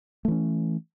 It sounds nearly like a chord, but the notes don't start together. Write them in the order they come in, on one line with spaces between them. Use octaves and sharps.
A3 E3 C#4